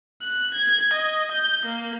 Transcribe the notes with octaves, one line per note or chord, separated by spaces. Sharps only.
F#6
G#6
D#5
G6
A#3